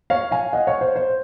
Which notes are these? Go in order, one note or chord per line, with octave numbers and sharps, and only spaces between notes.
C#5 F5
F5 G#5
D#5 F#5
C#5 F5
C5
C5